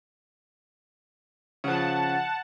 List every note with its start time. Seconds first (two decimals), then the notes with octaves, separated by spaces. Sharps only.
1.64 C#3 F3 F#5 A5